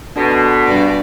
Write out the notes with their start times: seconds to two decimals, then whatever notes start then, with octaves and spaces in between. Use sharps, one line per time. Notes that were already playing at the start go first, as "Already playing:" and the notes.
0.16 B2 D3 D4
0.66 G2 D5